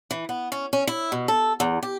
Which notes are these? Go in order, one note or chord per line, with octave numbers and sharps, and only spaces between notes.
E3
B3
C#4
C#4
E4
B2
A4
E2
G4